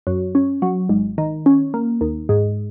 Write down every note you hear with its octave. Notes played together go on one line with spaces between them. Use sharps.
F#2
C#4
F#3
G#1
D#3
C#4
A#3
D#2
G#2